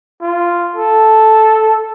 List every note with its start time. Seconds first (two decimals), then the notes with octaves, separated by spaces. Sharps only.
0.22 F4
0.76 A4